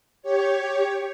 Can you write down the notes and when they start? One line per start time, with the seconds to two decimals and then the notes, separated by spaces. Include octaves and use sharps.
0.22 G4 C#5